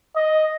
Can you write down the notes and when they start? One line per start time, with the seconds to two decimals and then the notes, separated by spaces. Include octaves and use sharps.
0.16 D#5